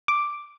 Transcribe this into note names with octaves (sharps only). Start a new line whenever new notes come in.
D6